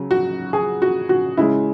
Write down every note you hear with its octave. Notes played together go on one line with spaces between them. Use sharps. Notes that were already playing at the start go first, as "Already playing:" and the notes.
Already playing: C#3 F#3
F#4
G#4
F#4
F#4
C#3 G#3 E4